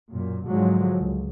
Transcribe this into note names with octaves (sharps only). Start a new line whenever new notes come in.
F#2 A#2
G#2 D3 F3 F#3 G#3
C#2